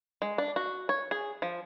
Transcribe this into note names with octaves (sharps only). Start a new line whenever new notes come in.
G#3
D4
F#4
C#5
G#4
F3